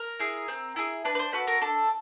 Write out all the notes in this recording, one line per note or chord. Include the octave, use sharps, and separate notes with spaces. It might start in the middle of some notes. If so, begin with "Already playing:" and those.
Already playing: A#4
E4 G#4
C4
E4 G#4
D4 B4
B4
C5
F#4 A4 B4
A#4
D4 A4